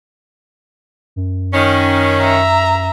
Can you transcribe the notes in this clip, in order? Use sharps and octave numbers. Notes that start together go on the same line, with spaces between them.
F#2
D#3 C#4
E5 A#5